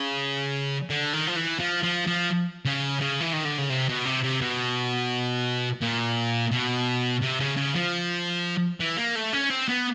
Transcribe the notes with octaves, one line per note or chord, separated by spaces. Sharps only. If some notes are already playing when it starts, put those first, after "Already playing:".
Already playing: C#3
D3
D#3
F3
E3
F3
F3
F3
C#3
C#3
E3
D#3
D3
C#3
C3
B2
C3
C3
B2
A#2
B2
C3
C#3
C#3
F3
E3
A#3
A3
C#4
C4
B3